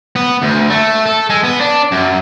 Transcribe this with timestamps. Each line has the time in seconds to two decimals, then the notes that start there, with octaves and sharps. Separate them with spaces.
0.16 B3
0.42 D2
0.70 A3
1.06 A4
1.30 G#3
1.44 B3
1.61 D4
1.91 F#2